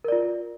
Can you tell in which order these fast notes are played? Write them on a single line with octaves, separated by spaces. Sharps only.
A#4 D5 F4